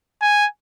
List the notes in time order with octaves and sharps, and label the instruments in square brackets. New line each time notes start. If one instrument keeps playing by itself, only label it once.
[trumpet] G#5